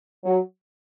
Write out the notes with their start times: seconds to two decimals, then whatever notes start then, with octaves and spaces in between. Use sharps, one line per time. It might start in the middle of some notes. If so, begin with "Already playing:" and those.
0.24 F#3